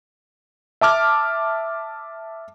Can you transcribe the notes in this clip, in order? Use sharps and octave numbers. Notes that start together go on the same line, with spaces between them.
E5 A5 D6 F6